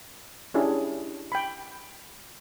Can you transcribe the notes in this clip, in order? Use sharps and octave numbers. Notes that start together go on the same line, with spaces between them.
C#4 D4 E4 G4 G#4
G5 B5